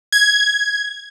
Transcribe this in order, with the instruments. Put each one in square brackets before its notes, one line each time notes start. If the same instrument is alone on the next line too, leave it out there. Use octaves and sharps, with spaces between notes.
[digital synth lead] G#6